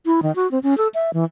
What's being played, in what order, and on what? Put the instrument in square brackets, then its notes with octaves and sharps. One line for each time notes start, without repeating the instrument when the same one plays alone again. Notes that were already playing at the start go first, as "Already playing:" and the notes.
[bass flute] E4
D#3
F#4
C4
C#4
A4
E5
E3